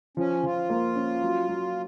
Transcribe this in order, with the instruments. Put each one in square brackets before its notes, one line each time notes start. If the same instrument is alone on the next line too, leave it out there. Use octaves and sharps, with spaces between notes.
[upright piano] F3 [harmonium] C#4
[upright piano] F3 [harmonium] F4
[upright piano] A#3
C#4
F#3
F#3